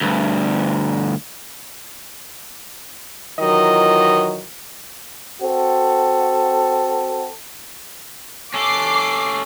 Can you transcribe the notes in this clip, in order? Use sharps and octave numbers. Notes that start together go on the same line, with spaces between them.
D2 G2
D#3 E3 F#3 F4 A#4 D#5
C4 F#4 A4
C#4 A4 D6 C7